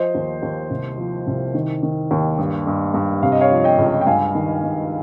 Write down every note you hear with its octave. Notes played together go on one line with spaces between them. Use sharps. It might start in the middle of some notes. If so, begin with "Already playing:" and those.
Already playing: F3 C5 D#5
D#2
D#2
C2
F3
C2
D#3
D#3
D#2
G2
G2
G2
C3 F5
D#5
C#5 F5
F3
D#5 G5
C#2
G5
G2 F5 G#5
D#3
G2